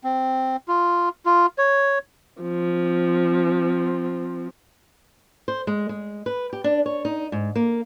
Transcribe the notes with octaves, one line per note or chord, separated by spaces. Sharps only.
C4
F4
F4
C#5
F3 C4
C5
G#3
G#3
B4
G4
D4
C#5
D#4
G#2
A#3